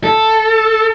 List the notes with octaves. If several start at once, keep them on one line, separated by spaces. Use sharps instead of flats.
A4